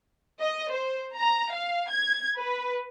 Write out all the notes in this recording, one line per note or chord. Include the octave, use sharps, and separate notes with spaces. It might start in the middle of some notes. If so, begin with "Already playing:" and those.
D#5
C5
A#5
F5
G#6
B4